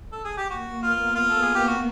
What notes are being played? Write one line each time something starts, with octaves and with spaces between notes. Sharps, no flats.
A4
G#4
G4
A#3 F#4
B3 F4
F4
A4
G#4
G4
F#4